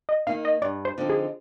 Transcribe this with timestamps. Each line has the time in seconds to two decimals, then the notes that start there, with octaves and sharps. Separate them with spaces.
0.09 D#5
0.27 D#3 A#3 D#4 F5
0.45 D#5
0.62 G2 D5
0.85 C5
0.98 D3 F3 C4 D#4
1.10 G#4